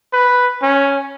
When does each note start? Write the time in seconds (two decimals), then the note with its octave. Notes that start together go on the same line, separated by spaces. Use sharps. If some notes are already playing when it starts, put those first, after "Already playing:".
0.13 B4
0.62 C#4